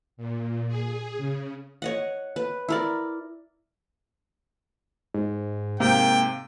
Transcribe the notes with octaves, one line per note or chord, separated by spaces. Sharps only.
A#2
G#4
C#3
C#5 D#5 F#5
B4
E4 A#4 D5
G#2
G#2 C3 A#3 F5 G5